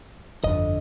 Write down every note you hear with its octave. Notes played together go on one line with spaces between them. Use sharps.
G1 F2 D3 D#5